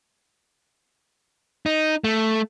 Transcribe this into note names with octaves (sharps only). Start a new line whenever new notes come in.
D#4
A3